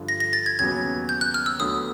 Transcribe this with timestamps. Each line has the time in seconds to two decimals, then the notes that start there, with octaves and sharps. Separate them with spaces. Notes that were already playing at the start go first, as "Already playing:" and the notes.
Already playing: G2 D3 F3
0.09 A#6
0.20 A#6
0.33 A6
0.46 G#6
0.59 D#2 C#3 F#3 B3 G#6
1.09 G6
1.21 F#6
1.34 F6
1.46 E6
1.59 D2 D3 F#3 B3 D#6